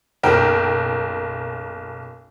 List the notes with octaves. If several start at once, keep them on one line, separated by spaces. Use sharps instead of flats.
F#1 B1 A#4 G5 F6